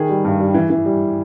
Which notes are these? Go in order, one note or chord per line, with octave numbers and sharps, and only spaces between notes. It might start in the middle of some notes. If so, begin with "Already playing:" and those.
Already playing: D#3 G#4
G3
G2
G3
E3
E3
G3